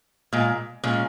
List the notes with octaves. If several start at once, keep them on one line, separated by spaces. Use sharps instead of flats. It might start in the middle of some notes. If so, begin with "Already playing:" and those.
A#2 G#3
A#2 G#3 C#4